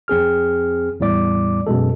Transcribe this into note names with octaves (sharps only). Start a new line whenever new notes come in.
F2 C4 G#4 F6
E2 A2 G3 D5 D6
F#2 B2 G#3 A4